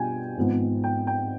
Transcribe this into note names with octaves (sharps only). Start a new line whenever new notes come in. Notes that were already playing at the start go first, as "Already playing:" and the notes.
Already playing: B2 G3 D4 F4 G5 G#5
G#1 G#2 F3 B3
G5
G5